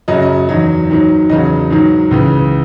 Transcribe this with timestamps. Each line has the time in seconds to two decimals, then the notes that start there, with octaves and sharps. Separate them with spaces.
0.08 F#2 C#3 F#3 D#5
0.22 D#5
0.49 E2 D#3 F#3
0.89 G#2 D#3 F#3
1.29 E2 C#3 F#3 D#5
1.70 G#2 D#3 F#3
2.11 C#2 C#3 E3